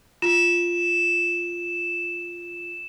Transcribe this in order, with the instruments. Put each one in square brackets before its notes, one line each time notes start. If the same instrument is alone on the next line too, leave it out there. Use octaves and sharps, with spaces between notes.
[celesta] F4 [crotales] E7